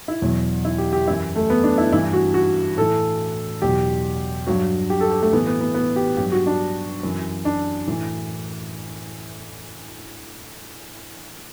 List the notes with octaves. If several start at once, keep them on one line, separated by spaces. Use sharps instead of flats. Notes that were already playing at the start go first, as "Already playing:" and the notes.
E4
E2 B2 F#3
E4
G4
G4
F#2 E3 E4
A3
B3
D4
E4
G2 E3 E4
F#4
F#4
A2 E3 A4
E2 B2 F#3 G4
G2 F#3 F#4
G4
A4
G4
A3
A2 E3 B3
B3
B3
B3
G4
G2 F#3 G4
F#4
D4
F#2 E3
D4
A2 E3